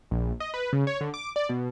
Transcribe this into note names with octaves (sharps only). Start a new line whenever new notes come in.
A#1
D#5
B4
C#3
C#5
D3
D6
D5
B2